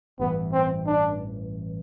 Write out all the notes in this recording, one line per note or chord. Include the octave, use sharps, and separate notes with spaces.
A1 G2 E3 B3
C4
D4